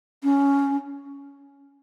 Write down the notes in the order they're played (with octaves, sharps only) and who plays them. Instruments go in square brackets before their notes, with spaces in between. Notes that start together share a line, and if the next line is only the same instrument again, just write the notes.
[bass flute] C#4